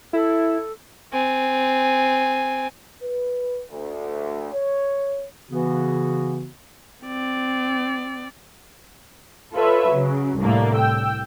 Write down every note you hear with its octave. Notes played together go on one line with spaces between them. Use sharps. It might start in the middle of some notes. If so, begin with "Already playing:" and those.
E4 A4
C4 G#5
B4
D2
C#5
C#3 E3 B3 F#4
C4 D5
F4 A4 B4 C#5 E5
C#3 F#3
C2 A2 D3 A#3 D5
G5 E6